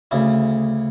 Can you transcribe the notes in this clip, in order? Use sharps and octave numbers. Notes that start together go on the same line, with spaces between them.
D2 C#3 E4